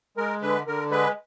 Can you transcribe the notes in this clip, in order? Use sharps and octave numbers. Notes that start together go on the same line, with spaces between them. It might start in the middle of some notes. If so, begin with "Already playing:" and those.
G#3 A#4
D3 B4
D3 A#4
G#3 B4